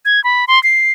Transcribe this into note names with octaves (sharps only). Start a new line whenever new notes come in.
G#6
B5
C6
C7